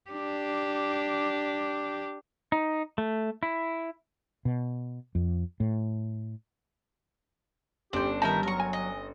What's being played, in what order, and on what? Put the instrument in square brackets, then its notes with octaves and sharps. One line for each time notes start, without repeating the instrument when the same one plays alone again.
[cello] D4 G4
[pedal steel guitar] D#4
A3
E4
[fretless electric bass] B2
F2
A2
[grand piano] G1 C#4 [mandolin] D4 C5 [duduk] G4
[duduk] D#3 [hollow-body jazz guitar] G3 D5 A5 [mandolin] D#4 E4 A#4
[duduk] F#3 [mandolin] A#4 C#6
[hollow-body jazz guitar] G#5
[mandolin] D#5